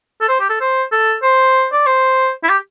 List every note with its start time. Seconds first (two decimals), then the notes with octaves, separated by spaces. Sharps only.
0.21 A4
0.29 C5
0.40 G4
0.50 A4
0.61 C5
0.92 A4
1.23 C5
1.73 D5
1.86 C5
2.44 E4
2.49 G4